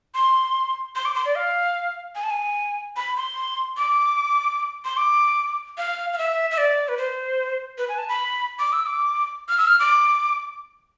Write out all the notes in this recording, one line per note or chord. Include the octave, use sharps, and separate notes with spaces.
C6
C6
D6
C6
D5
F5
G#5
A5
G#5
B5
C6
D6
C6
D6
F5
F5
E5
E5
D5
B4
C5
B4
G#5
A5
B5
D6
E6
D6
F6
E6
F6
D6